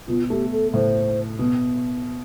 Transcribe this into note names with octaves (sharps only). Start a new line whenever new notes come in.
B2 F4
A3 G4
A4
A2 C5
B2